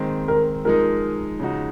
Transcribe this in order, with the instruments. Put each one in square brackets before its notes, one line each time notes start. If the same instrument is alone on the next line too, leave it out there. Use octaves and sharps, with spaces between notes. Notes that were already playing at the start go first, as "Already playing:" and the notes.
Already playing: [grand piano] D#3 G#3 C4
[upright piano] A#4
[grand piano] F3 G#3 D#4 [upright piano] A#4
[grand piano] C#3 F3 G#3 D#4 F#4